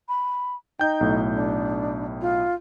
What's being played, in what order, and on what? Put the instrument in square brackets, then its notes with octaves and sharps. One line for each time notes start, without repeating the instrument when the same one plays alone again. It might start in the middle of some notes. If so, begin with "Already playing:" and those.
[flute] B5
[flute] D#4 [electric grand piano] G5 G6
[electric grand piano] B1 A2
[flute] D4
F4